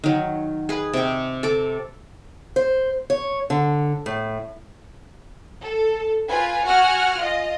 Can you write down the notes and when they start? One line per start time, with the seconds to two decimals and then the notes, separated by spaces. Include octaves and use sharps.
0.04 D#3 F#3
0.69 G#4 B4
0.93 C3 G5
1.43 A4 D6
2.56 C5
3.10 C#5
3.50 D3
4.06 A2
5.62 A4
6.28 F4 B4 G#5
6.65 F#4 F#5 G#5 F6
7.19 F4 D#5